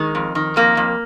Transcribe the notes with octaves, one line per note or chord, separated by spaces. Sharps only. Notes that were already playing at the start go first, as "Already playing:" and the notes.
Already playing: D#3 G#3
F2
D#3
F2 A#3
F2